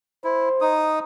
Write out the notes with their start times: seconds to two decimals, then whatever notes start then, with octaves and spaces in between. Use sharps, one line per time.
0.24 E4 C5
0.61 D#4 D#6